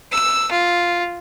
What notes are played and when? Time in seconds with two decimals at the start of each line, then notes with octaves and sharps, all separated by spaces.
0.12 E6
0.51 F4